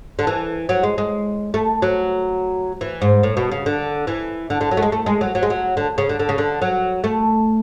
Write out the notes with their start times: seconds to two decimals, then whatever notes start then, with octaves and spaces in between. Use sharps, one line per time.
0.19 D3
0.27 E3
0.69 F#3
0.83 G#3
0.98 G#3
1.54 A3
1.82 F#3
2.81 E3
3.02 G#2
3.23 A2
3.37 B2
3.51 C#3
3.66 D3
4.07 E3
4.50 D3
4.61 D3
4.71 F#3
4.77 A3
4.82 G#3
4.92 A3
5.06 G#3
5.21 F#3
5.35 F#3
5.43 G#3
5.50 F#3
5.77 D3
5.98 C#3
6.09 D3
6.19 D3
6.29 C#3
6.38 D3
6.62 F#3
7.04 A3